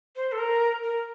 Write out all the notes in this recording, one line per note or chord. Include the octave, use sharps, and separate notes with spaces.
C5
A4
A#4
A#4